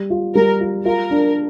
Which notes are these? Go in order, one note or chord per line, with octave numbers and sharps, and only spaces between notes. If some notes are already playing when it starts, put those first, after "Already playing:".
Already playing: G3
F4
G3 A#4
F4
F4 A#4
D4